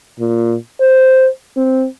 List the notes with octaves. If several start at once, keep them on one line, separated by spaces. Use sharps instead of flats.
A#2
C5
C4